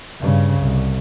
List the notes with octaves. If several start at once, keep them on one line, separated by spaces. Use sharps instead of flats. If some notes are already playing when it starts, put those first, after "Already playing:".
G2 C#3
C2